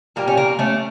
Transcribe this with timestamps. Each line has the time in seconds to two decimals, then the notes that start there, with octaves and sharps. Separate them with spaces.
0.16 A#2 G3 A#3
0.27 C#4
0.37 A#3
0.59 A3 C#4